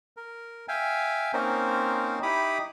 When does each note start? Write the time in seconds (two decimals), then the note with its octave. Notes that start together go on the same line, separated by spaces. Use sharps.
0.17 A#4
0.68 E5 F5 G5 G#5
1.33 A#3 C4 C#4 D#4 A#4 C5
2.23 D#4 E4 G4 B5 D6 D#6